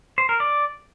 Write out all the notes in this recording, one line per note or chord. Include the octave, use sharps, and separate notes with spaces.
C5
A#4
D5